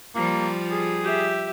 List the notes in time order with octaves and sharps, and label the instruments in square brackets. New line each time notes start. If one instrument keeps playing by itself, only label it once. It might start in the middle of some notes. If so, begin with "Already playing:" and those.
[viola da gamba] F3 G3 F4 [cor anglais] A#3
[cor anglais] G#4
[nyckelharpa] G4 E5